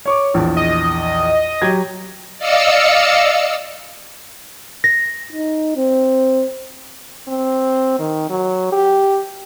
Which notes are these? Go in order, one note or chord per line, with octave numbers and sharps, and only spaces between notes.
C#5 C#6 D6
A#1 E2
D#5
F#3 G4 G#6
D5 D#5 F5 E6 C#7
A#6
D#4
C4
C4
D#3
F#3
G4